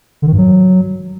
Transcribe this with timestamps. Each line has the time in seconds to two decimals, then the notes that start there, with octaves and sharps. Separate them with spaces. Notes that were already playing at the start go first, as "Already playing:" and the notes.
0.22 D3
0.27 D#3
0.33 G2
0.38 F#3